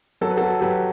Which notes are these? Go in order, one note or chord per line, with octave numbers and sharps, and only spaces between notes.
F#3 A4
B4
F#3 F#4 A4
F#3 G4 B4